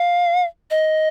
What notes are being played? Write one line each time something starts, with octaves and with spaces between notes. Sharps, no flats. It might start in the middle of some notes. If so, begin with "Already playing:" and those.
Already playing: F5
D#5